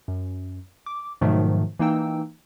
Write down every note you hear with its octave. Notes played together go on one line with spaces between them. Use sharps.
F#2
D6
G#2 B2 D#3 F3 F#3 A3
E3 A#3 D#4 G5 E6